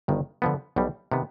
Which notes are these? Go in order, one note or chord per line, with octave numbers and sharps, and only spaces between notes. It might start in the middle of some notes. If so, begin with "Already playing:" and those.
G1 G2 D#3
D3 F3 B3
B1 B2 G3
C3 D#3 B3